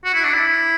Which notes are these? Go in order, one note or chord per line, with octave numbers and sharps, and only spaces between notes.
F#4
E4
D4
E4